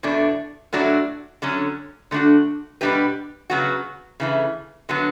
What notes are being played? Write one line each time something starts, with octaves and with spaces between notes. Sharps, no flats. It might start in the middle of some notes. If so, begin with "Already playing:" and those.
E2 B2 A3 D4
A2 F#3 A3 D4 F#4
D3 F#3 C#4
D3 A3 D4 F#4
B2 G3 D4 G4 B4
C#3 F#3 B3 F#4
C#3 E3 A3
D3 F#3 B3